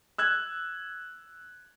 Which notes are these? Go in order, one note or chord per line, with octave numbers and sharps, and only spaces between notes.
E6 F#6 G#6